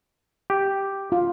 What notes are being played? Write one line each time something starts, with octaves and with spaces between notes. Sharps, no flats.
G4
F4